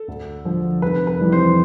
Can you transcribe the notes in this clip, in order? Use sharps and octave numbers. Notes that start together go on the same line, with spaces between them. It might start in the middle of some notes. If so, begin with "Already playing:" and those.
Already playing: A4
D2
D3 F3
F1 B4
B4
F2 E3 G3
C5